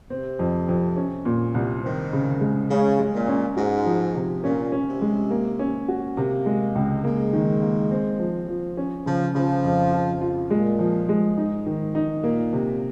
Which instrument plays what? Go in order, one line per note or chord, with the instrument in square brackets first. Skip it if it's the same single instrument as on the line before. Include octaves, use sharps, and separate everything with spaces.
[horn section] C3 [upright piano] C4
[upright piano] F2
F2
C#4
A#2
C2
[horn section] D#3 [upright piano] C4
[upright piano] C#3
G#3
[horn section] C#3 [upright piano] G#3
[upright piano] G#3
[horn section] A#2
[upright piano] C#4
[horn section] G#2 [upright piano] F#4
[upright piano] F3
C3
[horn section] A#2 [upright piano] C#4
[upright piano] C#4
[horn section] C3
[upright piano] G#3
A#3
C#4
F#4
[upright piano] C3 [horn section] A#3
[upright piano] G#3
C#2
[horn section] G#3 [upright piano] A#3
[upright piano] D#3
A#3
C4
F3
F3
C#4
[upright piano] C#3 [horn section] F3
[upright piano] C#3 [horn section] F3
[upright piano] F2
F4
F4
[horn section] A#2 [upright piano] G#3
[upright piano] F3
G#3
[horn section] G#2 [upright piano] D#4
[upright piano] D#3
D#4
[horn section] A#2 [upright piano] A#3
[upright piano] C3